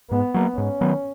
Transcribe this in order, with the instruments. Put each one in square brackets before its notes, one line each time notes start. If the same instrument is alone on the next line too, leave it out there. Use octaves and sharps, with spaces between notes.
[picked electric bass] G#2 [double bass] B3
[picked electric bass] F#3 A#3
[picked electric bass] G#2 [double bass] C#4
[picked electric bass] D#3 F#3 B3